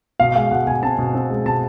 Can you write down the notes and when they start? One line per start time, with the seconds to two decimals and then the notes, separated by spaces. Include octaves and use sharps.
0.20 B2 F5
0.35 G#3 F5
0.51 B2 F#5
0.67 B2 G#5
0.83 C4 A5
0.99 B2
1.14 C4
1.30 G#3
1.46 B2 A5